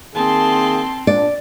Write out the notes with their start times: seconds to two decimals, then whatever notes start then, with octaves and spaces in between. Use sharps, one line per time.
0.15 D#3 A#3 C4 G#4 A5 C6
1.07 A#2 D4 D5